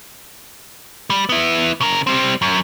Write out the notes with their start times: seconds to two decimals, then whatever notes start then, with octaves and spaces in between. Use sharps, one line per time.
1.10 G3
1.29 B3 E4
1.81 C#3 A#4
2.07 G3 C4
2.42 F#2